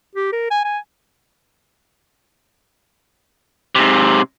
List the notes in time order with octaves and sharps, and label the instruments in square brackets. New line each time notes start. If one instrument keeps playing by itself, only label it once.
[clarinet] G4
A#4
G#5
G#5
[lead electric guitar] G#2 C3